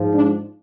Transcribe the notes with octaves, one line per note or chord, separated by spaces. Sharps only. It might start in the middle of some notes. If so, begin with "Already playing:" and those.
Already playing: G#2 F3
D4